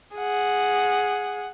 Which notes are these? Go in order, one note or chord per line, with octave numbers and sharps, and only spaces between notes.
G#4 F#5